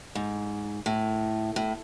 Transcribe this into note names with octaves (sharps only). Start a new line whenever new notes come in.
G#2
A2
A2